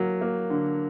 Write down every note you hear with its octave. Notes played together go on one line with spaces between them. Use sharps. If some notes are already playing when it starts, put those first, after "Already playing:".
Already playing: F#3 A#3
A#3
D3